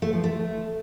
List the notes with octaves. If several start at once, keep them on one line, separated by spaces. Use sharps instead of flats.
A3
F3
A3